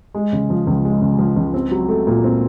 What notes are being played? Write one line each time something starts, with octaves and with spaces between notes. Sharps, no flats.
G#3
C#3
F3
C#2
G#3
C#3
F3
C#2
C4
F#3
A3
A#2
C4